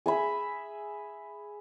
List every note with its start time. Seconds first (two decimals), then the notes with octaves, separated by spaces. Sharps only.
0.06 G#4 E5 B5